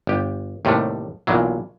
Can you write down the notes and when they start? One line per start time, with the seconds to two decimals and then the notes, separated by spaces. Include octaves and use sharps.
0.07 G1 G4
0.65 D#2 A2 C3 G3 A3
1.27 B1 A#2 E3 F#3